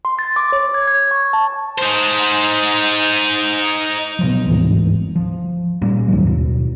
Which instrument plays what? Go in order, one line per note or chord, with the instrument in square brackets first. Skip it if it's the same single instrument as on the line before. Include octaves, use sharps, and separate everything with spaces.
[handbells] C6
A6
D6
C#5
G#6
G#6
C#6
A5
[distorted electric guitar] D#4 C5
[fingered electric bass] B2 F3 F#3
G1 D2 G#2 E3
F3
A#2 G3 A#3 C#4
C#2 G#2 D#3 F#3
D#2 B2